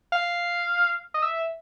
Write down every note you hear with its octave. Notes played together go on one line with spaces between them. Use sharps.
F5
D#5
E5